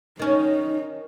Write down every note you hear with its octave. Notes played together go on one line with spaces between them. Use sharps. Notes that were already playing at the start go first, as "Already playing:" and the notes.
D#3 C#4 D#4